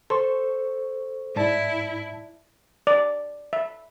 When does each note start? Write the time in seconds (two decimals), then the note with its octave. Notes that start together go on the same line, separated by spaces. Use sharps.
0.10 A4 C5 C6 C#6
1.36 G#2 E4 D5 A5
2.87 D5
3.53 E5